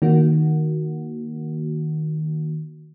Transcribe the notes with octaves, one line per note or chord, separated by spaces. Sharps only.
D#3 A#3 F#4